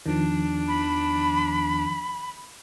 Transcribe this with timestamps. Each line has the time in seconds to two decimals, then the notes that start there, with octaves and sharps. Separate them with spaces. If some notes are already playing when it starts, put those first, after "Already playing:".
0.06 E2 D#3 F3 D4
0.68 B5